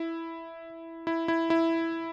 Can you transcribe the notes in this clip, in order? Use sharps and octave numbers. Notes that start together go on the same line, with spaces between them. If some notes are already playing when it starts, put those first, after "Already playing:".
Already playing: E4
E4
E4
E4